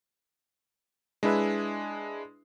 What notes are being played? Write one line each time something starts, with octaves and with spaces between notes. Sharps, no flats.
G#3 D4 E4 G#4 B4 E5